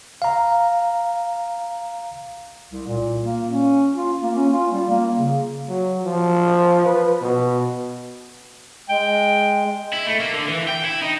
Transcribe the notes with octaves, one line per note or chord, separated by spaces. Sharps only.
F5 A#5
C2
A#2
A#3
C#4
F4
A#3
C#4
F4
G3
A#3
C#3
F#3
F3
B4
B2
G#3 G5
E4
A3
A#3
D3
E3
G5
E4
D#4